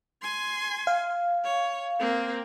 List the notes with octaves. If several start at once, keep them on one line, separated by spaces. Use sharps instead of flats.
G#5 C6
F5
C#5
A#3 C4